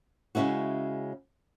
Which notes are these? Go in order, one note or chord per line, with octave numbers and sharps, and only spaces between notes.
C#3 G#3 C#4 E4 F#4